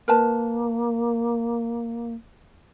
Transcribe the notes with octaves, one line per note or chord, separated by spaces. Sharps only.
A#3 A#4 B4 A5